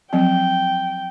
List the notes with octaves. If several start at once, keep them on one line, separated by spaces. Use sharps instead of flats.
F3 F#3 C4 G5